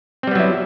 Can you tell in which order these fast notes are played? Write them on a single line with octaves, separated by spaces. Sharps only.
C4 G3 B3 F#3 E4